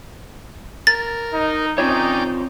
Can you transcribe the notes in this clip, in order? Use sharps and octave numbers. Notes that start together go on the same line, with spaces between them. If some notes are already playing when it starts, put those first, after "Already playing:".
A#4 A6
D#4
C4 C#4 D#4 F4 C#5 D5 G5